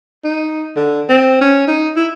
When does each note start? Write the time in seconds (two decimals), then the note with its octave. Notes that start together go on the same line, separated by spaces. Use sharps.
0.24 D#4
0.76 D3
1.09 C4
1.41 C#4
1.68 D#4
1.96 E4